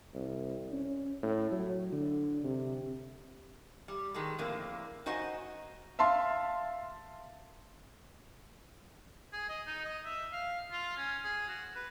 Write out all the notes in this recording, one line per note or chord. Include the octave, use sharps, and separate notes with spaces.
C2
C#4
A2
F#3
D3
C3
G3
D#3 G#3 A4
F2 A2 D3 A#3
D#4 F#4 C5 D#5 F#5 G#5
E5 F5 A5 C6
G#4
D#5
D#4
D#5
E5
F5
F4
C#4
G#4
F#4
B4